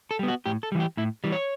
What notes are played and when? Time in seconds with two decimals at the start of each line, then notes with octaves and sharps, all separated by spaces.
0.11 A4
0.19 G3 B3
0.28 F#4
0.46 A2 G4
0.63 A4
0.72 E3 G3
0.80 G4
0.97 A2 E4
1.24 E3 G3
1.32 C#5